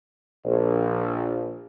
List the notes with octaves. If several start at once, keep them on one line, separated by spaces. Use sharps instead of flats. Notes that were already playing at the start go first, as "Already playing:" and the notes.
A#1